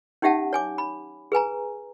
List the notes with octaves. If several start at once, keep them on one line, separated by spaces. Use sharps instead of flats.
C#4 D#4 G4 E5 F#5 A5
C#5 G#5 D6
B5
G#4 B4 G#5 A#5